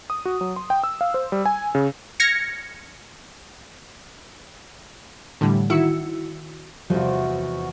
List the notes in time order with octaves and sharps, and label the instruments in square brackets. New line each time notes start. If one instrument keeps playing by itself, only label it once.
[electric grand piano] D#6
F#4
F#3
C6
G5
E6
F5
C5
G3
G#5
C#3
[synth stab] F6 G#6 A#6 C#7
[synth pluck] A2 D3 E3 G3
D#3 E4 F#4 E6 C#7
[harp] F1 E2 [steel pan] F3 G3 [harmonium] F#4